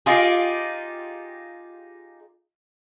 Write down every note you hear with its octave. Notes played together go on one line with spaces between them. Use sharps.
D#4 F4 G4 G#4